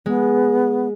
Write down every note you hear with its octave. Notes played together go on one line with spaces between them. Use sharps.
G#3 B3